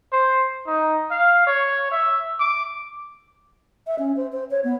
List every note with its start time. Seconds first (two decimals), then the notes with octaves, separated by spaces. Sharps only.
0.12 C5
0.67 D#4
1.11 F5
1.47 C#5
1.92 E5
2.40 D6
3.87 E5
3.98 C#4
4.16 C5
4.32 C5
4.50 C#5
4.63 B3